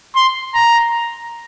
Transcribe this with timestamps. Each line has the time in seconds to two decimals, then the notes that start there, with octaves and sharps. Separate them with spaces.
0.15 C6
0.54 A#5